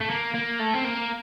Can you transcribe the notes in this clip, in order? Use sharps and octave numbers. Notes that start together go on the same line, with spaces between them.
A3
A#3
A#3
A3
C4
A#3